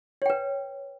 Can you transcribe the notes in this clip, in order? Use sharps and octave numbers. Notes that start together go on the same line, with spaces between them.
B4 C#5 G5